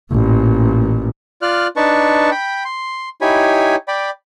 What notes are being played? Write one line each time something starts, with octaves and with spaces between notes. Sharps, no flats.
A1 A#2
F4 D5 F6 F#6
D4 D#4 B4 A5 C#6
G5 B5
C6
D#4 E4 G4 C#5 G#5 B5
D5 G5 B5